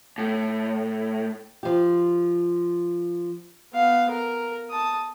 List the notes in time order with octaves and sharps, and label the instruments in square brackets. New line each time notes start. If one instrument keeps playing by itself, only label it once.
[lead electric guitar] A2
[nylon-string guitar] F3 G4
[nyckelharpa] B3 F5
A#4
A5 D#6